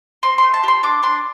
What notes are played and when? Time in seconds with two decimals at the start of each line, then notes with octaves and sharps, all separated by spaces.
0.23 C4 C6
0.38 A3 C6
0.54 A5
0.63 G4 C6
0.83 D4 D6
1.03 D4 C6